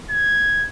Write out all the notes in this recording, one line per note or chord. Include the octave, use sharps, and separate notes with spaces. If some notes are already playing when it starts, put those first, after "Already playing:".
G#6